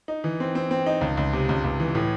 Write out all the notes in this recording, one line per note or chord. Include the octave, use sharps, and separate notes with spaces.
D#4
E3
C4
C4
C4
D#4
C#2
C#2
C3
C#2
C#2
E3
A2